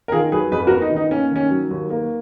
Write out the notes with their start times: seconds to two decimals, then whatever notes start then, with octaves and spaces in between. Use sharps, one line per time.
0.08 A#4
0.12 D#3 F4 G#4
0.31 F#3 G#4 B4
0.52 F2 G#4 B4
0.67 F#4 A#4
0.71 B3
0.81 D#4
0.91 D#3
0.96 D#4
1.11 A#3 C#4
1.31 D#3 C#4
1.51 F#3
1.71 D#2
1.90 A#3